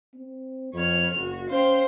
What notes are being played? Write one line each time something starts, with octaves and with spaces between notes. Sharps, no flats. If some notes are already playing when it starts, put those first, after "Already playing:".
C4
F2 C#5 B5 F6
F#1 F#4
C#4 C5 F5 G5